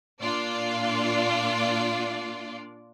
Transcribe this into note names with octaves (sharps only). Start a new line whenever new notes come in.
A#2 D4 F4 D5